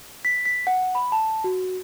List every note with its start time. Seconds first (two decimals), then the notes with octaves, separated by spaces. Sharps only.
0.25 B6
0.45 B6
0.67 F#5
0.95 B5
1.12 A5
1.44 F#4